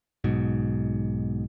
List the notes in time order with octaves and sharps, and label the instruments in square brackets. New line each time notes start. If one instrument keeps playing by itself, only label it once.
[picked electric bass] B1 G#2 B2